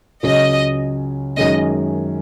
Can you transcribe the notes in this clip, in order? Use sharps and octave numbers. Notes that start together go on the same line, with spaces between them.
C#2 C#3 F#3 C#4 D#5
F#2 D#3 G#3 C#4 D#5